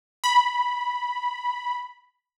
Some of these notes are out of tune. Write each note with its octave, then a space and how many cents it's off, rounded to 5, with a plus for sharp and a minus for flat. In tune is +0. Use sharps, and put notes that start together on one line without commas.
B5 -5